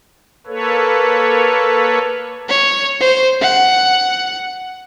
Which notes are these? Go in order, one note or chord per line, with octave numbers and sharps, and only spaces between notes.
A#3 A4 B4 C#5
C#5
C5
F#5